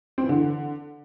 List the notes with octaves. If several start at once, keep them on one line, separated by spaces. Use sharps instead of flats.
C4
E3
D3